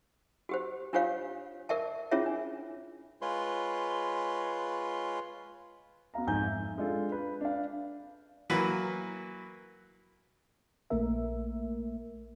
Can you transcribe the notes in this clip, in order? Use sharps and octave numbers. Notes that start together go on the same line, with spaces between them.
F#4 G4 C5
D4 F4 G4 C5 C#5 F5
A#4 D5 E5 A5
C#4 E4 F4 G#4 C#5 E5
D4
G#3 F4 B4 C#5 C6
B3 F#4 F5 A#5
F2 G#2 G#5 G6
E5
G#3 D4 F4 A4
B4
D4 F5
E3 F#3 A#3 B4 B5
A#1 A3 A#3 A#4 E5